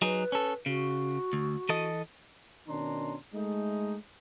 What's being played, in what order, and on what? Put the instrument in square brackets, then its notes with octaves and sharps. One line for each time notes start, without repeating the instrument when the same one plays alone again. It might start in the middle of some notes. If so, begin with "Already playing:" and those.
[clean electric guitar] F#3 D#4 G#4 [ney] B4
[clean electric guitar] C#4 A4
[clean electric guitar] C#3 [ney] F#4
[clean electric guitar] D2
E3 A4 D#5
[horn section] B2 D#3 C#4 D4 A#5 C6
G#3 A3 D#4